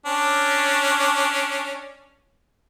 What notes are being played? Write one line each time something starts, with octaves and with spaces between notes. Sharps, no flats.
C#4 D4